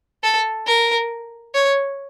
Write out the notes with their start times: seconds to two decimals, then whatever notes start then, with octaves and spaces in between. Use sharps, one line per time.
0.23 A4
0.67 A#4
1.55 C#5